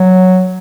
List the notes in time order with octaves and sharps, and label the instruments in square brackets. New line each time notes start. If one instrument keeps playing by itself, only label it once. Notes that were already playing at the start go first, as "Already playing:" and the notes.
Already playing: [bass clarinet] F#3